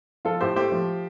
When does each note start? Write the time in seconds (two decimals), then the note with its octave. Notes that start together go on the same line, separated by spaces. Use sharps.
0.25 F3 F4 A4
0.41 A2 G4 C5
0.56 A3 G4 C5
0.72 F3